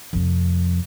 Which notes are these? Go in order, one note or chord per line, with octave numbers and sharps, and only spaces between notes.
F2 C3